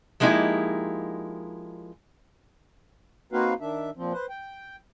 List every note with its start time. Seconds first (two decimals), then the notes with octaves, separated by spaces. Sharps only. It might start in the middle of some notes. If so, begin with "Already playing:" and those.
0.20 F3 G#3 A#3 D#4 E4 G4
3.33 A#3 C4 D#4 F#4 B4 F5
3.60 D#3 D4 E5
3.97 A#2 F3 C4
4.13 B4 C5
4.29 G5